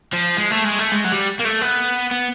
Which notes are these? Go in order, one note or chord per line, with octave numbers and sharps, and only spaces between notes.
F3
G#3
A3
G#3
A3
G#3
F#3
G3
A#3
A3
B3
B3